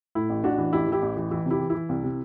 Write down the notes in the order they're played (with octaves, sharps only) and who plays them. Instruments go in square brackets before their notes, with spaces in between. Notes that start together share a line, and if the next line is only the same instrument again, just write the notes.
[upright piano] A2 E4
A1
A1 D4 F#4
E3
A1 E4 G4
E3 E4 G4
A1
E3
E3 E4
C3 E4 G4
E3
E4
E3
C2
C3